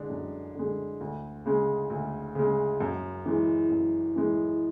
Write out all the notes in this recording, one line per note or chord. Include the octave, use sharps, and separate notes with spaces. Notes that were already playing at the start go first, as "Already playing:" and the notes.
Already playing: D3 G#3
F#2
D3 G#3
D2
C#3 G#3
D2
C#3 G#3
F#2
E3 G#3
F#2
E3 G#3